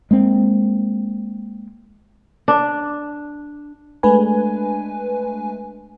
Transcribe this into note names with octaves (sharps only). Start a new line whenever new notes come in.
G#3 A#3 C4
D4
G#3 A3 D4 B4 G#5